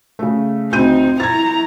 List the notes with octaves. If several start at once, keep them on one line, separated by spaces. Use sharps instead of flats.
C#3 A3
D2 C4 D#4 G6 D#7
E4 A#5 G#6 A6